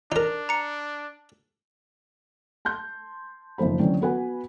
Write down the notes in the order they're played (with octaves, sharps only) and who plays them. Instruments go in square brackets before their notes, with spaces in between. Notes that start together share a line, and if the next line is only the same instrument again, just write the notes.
[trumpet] D4 [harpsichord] D#4 A#4
[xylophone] A#5 C#7
[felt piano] A5 C6 G6
F#1 D#3 F3 C5 B5
D3 E3 F#3 C4 C#4
B3 F#4 B4 F#5 G#5